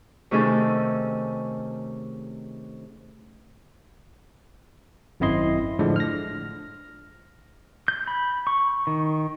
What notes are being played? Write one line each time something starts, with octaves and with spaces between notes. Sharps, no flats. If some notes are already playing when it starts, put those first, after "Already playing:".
C3 D#3 A3 C#4 G#4 A4
G#1 F#2 C4 E4 D#5 C6
A2 D3 F3 G#3 D4
F6 A#6
G6
B5
C#6
D#3